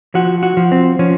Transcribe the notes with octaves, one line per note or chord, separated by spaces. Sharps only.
F3 F#4
F#4
F3
C4
F3 C#4